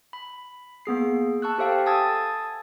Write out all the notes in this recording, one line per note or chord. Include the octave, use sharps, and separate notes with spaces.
B5
A#3 B3 G#4 C7
A5 C#6 E6 F#6
G4 A4 C5 E5 F5 G5
G#5 A5 D#6 E6 G#6 A6